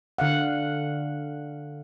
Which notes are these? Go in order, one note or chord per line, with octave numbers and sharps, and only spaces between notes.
D3 F5 F#5